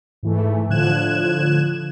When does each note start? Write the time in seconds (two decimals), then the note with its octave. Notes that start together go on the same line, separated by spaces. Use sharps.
0.23 G#2 E3 A3
0.69 A2 D3 F3 F#6 G#6 E7